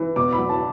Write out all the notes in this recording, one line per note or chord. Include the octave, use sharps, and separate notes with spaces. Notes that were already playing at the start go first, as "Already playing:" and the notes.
Already playing: E3
B2 D6
B5
F#3
A5